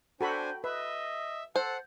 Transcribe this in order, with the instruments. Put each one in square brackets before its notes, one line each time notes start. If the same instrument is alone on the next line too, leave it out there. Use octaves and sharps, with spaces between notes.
[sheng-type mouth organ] D4 C5 G#5 [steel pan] F#4 A4 B5 [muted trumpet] G5
[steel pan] B4 [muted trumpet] D#5 [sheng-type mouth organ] E5
[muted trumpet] A4 [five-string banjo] C5 [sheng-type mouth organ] F#5